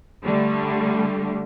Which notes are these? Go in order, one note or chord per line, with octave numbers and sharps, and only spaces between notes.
D3 G3 A3